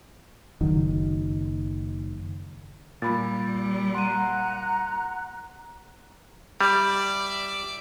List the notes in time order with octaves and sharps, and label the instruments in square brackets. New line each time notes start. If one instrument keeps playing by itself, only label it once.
[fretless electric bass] F#1 D#3 F#3
[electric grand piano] A#2 [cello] G3 [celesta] B5 A6
[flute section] F#5 A#5 F#6 [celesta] C6 D#7
[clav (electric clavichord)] G3 [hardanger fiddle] D5 E5